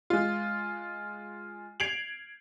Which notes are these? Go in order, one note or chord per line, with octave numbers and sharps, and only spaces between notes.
G#3 F4
G#6 C7 D7 F7 F#7